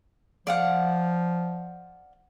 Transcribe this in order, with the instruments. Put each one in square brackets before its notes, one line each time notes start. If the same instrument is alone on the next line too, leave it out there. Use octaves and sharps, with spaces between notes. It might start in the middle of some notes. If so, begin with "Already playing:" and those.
[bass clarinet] F3 [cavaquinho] D5 F5 F#5